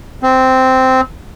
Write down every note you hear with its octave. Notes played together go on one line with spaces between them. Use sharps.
C4